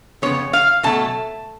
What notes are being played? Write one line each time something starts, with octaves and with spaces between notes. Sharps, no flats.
F2 C#3 G#3 B3 C#5
F5
B2 F#3 A3 A5